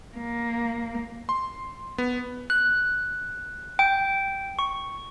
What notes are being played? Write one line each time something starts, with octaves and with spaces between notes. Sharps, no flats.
A#3
C6
B3
F#6
G5
C#6